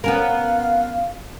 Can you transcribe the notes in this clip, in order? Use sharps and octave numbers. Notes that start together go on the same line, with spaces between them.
B3 C#4 A#4 F5